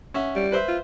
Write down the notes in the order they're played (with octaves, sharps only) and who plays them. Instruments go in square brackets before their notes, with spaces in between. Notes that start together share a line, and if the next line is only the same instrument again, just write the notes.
[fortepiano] C#4 E5 F#5
[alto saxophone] G3
[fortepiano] B4 C5 E5
[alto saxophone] F4